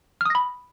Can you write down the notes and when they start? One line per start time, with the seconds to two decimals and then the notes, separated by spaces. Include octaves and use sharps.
0.21 F6
0.25 D#6
0.30 A#6
0.35 B5